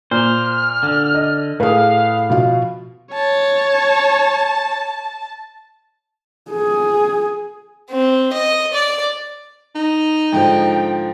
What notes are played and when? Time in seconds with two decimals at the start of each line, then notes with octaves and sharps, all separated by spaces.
0.11 A#2 C5 F6
0.83 D3
1.15 D#5
1.60 A2 G#4 B4 F5
2.30 B2 F3 F5
3.13 C#5 A5
6.51 G#4
7.91 C4
8.33 D#5
8.73 D5
9.75 D#4
10.32 G#2 D3 F3 G5